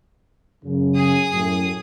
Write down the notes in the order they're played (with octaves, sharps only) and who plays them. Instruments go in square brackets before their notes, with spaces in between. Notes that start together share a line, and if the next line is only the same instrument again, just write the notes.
[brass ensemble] F#2 C#3
[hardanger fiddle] G#4 D#6
[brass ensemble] F#2 A2